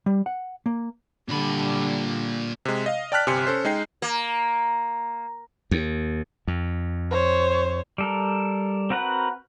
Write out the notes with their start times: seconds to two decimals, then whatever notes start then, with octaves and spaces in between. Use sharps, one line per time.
0.06 G3
0.26 F#5
0.66 A#3
1.29 A#2 D3 G3 B5
2.65 C3 G#3
2.86 D#5 F5
3.12 D5 G5 A5 F6 F#6 B6
3.27 G1 C3 G4 G#5 C6 C#7
3.47 C#4 A4 C5
3.65 G#3 D#4 G5 C7
4.02 A#3
5.71 D#2
6.47 F2
7.10 C5 C#5
7.98 G3 A4 A#4
8.90 C4 F#4 A#4 B4 F#5